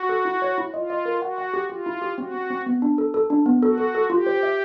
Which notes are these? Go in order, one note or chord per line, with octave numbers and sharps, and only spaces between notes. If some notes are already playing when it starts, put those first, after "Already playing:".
Already playing: F#4
A4
E4
C#5
E4
F4 D#5
D#5
A#4
F#4 F#5
F#5
G4
F4 G4
E4
G4
C4 F#4
C4
C4
B3
D4
A4
A4
D4
B3
F#4 A4
A4
A4
F4 G4
C5
E5